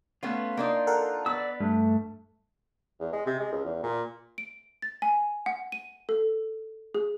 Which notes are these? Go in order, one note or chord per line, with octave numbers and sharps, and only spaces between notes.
A3 B3 C#4 F4
A#3 D4 D#4
A4 A#4 F#5
B3 D5 E6
G2 A3
E2
G#3
C3
G#3
C#2
E2
A#2
D7
A6
G#5
F#5
D#7
A4
G#4